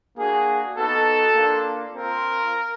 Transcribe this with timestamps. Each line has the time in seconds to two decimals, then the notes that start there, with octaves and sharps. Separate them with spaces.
0.17 A#3 D4 F#4 G#4
0.76 B3 D#4 F#4 A4
1.36 A#3 D4 F4
1.95 C4 F4 A#4